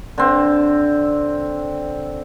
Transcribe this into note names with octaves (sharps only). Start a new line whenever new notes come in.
D3 C4